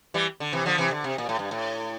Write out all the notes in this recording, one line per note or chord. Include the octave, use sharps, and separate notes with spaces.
E3 G3
D3
C3 E3
D3 F3
C3 E3
D3
C3
A#2
A2
G2
A2